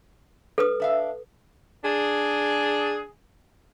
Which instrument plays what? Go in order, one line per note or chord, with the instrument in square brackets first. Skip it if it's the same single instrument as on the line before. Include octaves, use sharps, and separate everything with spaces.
[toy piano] A4 B4 D#6
[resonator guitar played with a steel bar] D4 E5 F5
[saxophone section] D4 G#4